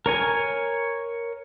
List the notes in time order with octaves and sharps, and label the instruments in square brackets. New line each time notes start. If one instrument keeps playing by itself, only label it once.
[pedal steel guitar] A#4 C#5 G#5